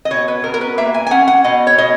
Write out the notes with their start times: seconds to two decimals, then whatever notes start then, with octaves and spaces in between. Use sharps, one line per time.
0.05 D#5
0.11 B2 C#5
0.28 B4
0.44 B2 A#4
0.54 A#4
0.61 B4
0.78 A#3 E5
0.94 G#5
1.07 G#5
1.11 C#4 F#5
1.28 F#5
1.44 B2 D#5
1.67 C#5
1.78 B2 D#5